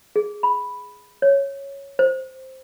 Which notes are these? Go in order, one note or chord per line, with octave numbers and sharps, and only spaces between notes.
G#4
B5
C#5
C5